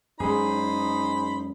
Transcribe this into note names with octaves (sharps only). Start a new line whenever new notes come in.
F#2 G#3 D#4 G#4 C5 B5